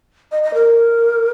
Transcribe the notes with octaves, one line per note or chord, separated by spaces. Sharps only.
D#5
D#5
A#4